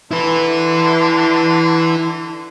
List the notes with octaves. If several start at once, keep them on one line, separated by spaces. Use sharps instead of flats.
D3 E4 B4